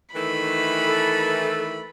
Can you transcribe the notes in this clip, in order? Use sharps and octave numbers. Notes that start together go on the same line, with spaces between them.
D#3 E3 A3 B5
A4